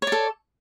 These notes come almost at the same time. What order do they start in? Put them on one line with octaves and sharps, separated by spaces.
C#5 D5 A4